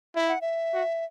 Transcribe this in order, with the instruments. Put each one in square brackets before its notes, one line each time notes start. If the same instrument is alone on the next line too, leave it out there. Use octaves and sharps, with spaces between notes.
[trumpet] E4 [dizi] E5
[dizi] F#5
E5
[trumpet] F#4